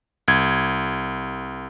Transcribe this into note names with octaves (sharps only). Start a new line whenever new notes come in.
C2 G#6